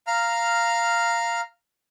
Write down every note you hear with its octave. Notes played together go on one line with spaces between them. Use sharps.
F5 A#5 F6